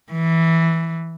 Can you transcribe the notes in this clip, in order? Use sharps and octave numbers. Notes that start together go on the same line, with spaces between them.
E3